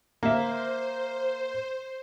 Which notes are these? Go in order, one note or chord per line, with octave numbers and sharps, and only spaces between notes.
A#3 C5 E5